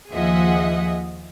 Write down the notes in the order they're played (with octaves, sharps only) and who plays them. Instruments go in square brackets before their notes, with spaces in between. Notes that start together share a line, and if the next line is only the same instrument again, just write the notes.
[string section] D#2 F3 G#4 D#5 E5 F#5